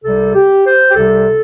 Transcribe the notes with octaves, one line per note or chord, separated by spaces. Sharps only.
C2 C3 G3 A4
G4
C5
G4
C2 C3 G3 A4